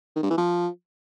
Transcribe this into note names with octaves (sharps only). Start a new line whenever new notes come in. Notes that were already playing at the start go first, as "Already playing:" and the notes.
D#3
G2
E3
F3